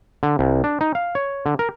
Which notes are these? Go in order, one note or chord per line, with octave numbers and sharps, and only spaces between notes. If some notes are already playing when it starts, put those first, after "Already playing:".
D3
C2
D4
D#4
F5
C#5
D3
A#4